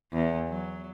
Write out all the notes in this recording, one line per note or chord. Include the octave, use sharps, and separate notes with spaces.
E2
F#3